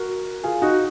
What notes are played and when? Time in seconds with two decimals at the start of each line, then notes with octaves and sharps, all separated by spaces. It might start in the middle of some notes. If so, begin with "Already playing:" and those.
Already playing: F#4 A#4
0.43 F4 G#4
0.62 D#4 F#4